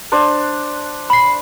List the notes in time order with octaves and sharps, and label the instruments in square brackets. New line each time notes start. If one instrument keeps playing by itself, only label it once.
[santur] D4 C5
[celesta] B5 C7